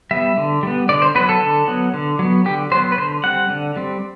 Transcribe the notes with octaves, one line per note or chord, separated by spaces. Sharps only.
G3 B3 E5
D3
G3 B3
D3 D5
C5
F#3 B3 B4
A4
D3
F#3 B3
D3
F#3 B3
D3 G4
F#3 B3 C5
B4
D3 C5
G3 C4 F#5
D3
G3 C4